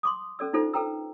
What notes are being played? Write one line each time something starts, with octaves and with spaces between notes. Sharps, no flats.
C6 D6 D#6
C#4 A4 D5 E6
D4 D#4 F4 A4 C5
A4 B4 G5 A#5 E6